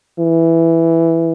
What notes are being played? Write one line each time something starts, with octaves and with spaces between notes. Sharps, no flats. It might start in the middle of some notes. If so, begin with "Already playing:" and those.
E3